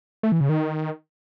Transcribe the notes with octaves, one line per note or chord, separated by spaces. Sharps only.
A3
E3
C#3
D#3